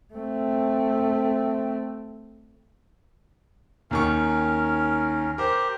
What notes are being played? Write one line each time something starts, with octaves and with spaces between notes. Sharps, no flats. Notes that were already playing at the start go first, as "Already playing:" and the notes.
A3 C4
D#2 D#3 C#4 A#4 C#6
G4 A#4 C5